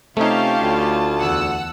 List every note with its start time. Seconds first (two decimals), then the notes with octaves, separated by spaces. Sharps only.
0.17 C3 A3 C#4 D#4 F4 G4 F5 A5
0.61 D2
1.18 E2 F#5 E6